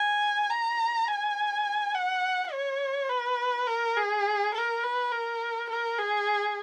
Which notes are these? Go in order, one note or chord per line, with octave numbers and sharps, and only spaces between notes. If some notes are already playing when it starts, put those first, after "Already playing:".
Already playing: G#5
A#5
G#5
F#5
C#5
B4
A#4
G#4
A#4
B4
A#4
A#4
G#4